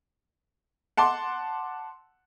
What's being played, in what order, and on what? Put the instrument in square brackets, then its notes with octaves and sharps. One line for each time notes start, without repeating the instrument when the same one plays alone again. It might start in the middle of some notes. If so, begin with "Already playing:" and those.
[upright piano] F#5 A5 C6 D6